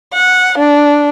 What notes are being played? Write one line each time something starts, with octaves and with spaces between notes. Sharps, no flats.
F#5
D4